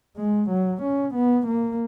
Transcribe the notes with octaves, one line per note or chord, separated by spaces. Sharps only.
G#3
F#3
C#4
B3
A#3